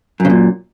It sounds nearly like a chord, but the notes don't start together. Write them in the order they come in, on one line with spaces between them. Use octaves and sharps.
F#2 C#3 A#2